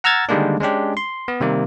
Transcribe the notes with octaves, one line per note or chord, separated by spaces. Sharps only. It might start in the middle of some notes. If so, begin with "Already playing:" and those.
F#5 A#5 E6 F6 G#6 A6
D3 D#3 G3 G#3 A#3 D4
G#3 C#4 D4 G4
C6
B3
C3 D#3 G3 A#3